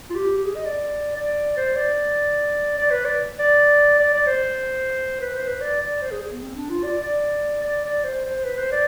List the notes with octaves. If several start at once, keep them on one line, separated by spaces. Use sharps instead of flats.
F4
G4
G4
G#4
D#5
D5
D5
C5
D5
D5
B4
D5
D5
D5
D5
C5
B4
C5
B4
D5
D5
C5
G#4
G#4
B3
C4
D4
F4
D5
D5
D5
D5
C5
C5
B4
C5
D5